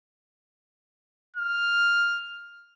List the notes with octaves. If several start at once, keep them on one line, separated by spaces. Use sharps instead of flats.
F6